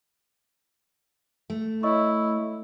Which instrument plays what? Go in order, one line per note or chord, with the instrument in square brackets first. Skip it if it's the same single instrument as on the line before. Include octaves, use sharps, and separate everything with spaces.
[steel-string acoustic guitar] A3
[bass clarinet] E4 [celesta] C#5 D#5 C#6